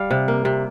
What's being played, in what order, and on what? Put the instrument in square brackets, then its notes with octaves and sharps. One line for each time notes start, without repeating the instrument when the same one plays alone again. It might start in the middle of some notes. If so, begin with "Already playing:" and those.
Already playing: [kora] G3 F5
C3
A#3
C3